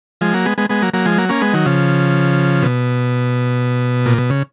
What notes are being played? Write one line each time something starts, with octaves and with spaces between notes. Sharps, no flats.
F3 G#3
F#3 A#3
G#3 B3
G#3 B3
G#3 B3
F#3 A#3
F#3 A#3
F3 G#3
F#3 A#3
A#3 C#4
G#3 B3
D#3 F#3
C#3 F3
B2
A#2
B2
C#3